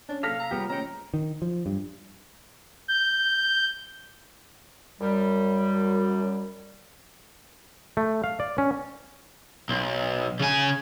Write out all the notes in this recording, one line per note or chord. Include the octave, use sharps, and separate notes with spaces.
C#4 D4
C3 F#3 A#3 A4 F5 F6 A#6 B6
A#5 E6
G3 B3 F4 G4 G#4 C#5
D#3 A3 A#3 C4 C#4 G5 A#5
D#3
F3
G2
G6
F#2 G3
A3
F5
D5
C#4
B1
C#3 G#5